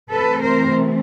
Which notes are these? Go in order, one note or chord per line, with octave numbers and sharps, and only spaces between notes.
C3 E3 A3 C4 A4 B4
A#4 C5